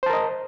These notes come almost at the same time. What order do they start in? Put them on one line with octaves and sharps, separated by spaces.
C5 A5 A#4 D#5